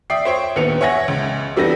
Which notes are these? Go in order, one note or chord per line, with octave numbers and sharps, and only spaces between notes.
D5 E5 G5 D#6 C7
C5 C#5 G5
A#1 D#2 B3 C#7 F7
C#5 E5 F#5 G#5 G#6 A#6
C#2
E3 G3 B3 D4 A4 A#6